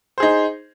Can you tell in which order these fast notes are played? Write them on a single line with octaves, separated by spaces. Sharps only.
C5 G#4 D#4